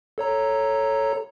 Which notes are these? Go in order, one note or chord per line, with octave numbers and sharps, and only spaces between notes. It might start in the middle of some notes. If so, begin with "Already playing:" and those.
A4 C#5 A#5